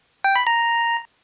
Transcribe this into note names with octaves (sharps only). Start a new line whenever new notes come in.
G5
B5
A#5